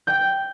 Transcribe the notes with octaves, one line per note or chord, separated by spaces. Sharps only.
G5 G6